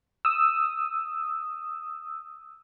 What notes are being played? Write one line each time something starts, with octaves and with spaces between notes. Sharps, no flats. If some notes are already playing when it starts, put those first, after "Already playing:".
D#6 E6